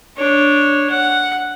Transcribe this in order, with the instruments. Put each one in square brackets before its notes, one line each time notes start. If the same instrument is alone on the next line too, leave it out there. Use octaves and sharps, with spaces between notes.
[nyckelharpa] D4 C#5
F#5